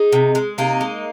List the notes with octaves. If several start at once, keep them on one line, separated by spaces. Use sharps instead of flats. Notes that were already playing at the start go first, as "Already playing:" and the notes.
Already playing: D#4 G#4
C3
G#3
C3 A#3 D#4
G#3